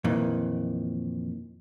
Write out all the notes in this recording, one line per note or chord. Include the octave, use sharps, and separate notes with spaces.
F2 A#2 D#3 E3